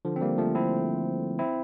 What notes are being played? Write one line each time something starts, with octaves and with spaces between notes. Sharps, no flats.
D3 F3
C4
G3 A#3
F3 A3
C4 E4
C4 E4